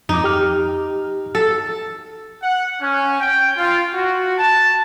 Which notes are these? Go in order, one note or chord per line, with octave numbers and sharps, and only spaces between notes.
F2 D#4 D6
G4 F6
A4
F#5
C#4
G5
F4
F#4
A5